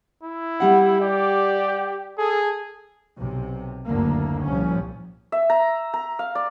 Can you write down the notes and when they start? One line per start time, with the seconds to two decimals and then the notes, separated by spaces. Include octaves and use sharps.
0.23 E4
0.60 G3 F#5
1.01 G4 D5
2.18 G#4 A4
3.16 B1 C3
3.86 F#1 D2 D3 A#3
4.44 C2 A#2 F3 C#4
5.32 E5
5.50 A#5
5.94 A#5
6.19 F5
6.35 D5